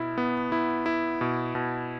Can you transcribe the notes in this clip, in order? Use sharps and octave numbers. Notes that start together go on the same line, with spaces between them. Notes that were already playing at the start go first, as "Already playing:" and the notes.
Already playing: B2 E4
B3
E4
E4
B2
B2